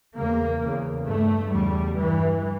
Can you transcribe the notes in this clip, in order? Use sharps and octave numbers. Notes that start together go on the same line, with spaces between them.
E2 C#3 A#3
E2 C#3
G2 A3
E2 C#3 G3
G2 E3